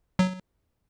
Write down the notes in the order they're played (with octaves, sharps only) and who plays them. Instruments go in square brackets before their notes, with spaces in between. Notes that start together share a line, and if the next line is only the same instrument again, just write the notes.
[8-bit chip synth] F#3